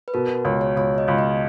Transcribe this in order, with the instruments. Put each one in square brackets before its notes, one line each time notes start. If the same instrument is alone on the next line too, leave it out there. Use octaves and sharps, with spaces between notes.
[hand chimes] B4
[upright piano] B2 [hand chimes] A#4
[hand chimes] F#4
[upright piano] C#2 [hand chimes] C#5
[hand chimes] C#5
[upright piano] C#2 [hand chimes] C#5
[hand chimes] D#5
[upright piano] C#2
[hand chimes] D#5